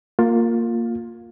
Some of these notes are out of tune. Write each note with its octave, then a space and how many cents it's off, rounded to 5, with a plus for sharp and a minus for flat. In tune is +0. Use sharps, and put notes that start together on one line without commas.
A#3 -10 F4 +15